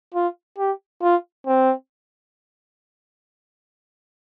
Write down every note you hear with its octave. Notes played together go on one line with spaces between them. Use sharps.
F4
G4
F4
C4